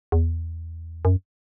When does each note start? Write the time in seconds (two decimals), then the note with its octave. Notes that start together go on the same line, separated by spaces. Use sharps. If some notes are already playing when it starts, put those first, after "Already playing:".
0.12 E2
1.05 F#2